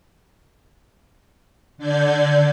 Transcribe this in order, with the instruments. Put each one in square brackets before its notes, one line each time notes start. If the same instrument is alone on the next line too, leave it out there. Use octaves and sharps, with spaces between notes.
[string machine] D3 D5 G6 G#6